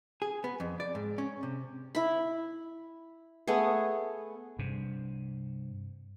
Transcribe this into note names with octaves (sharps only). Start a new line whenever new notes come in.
G#4
B3
F2
D5
G#2
C#4
C3
E4 B5
A3 B3 G#4
G2 C3